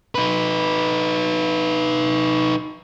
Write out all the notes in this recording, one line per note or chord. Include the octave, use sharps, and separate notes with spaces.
D#4 B4